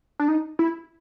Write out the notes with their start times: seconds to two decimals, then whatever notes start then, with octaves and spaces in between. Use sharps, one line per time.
0.20 D4
0.28 D#4
0.59 E4